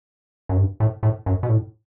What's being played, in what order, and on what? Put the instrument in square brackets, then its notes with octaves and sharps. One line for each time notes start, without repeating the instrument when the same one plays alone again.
[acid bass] F#2
G2
A2
A2
F#2
B2
A2